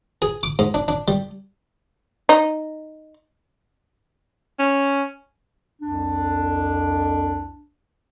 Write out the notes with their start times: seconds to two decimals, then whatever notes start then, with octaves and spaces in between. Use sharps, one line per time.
0.22 G#4
0.43 D6
0.59 G#2
0.74 D4
0.88 D4
1.08 G3
2.29 D#4
4.59 C#4
5.82 C2 F2 D4